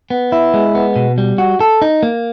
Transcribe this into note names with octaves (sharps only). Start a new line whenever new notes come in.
B3
E4
G#3
B3
B2
G3
F#4
A4
D#4
A#3